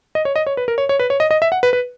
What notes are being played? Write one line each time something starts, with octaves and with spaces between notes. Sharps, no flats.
D#5
C#5
D#5
C#5
B4
A#4
C#5
C#5
B4
C#5
D#5
D#5
E5
F#5
B4
B4